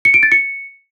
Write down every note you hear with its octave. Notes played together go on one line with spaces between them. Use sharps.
C#7
D7
A6
C#7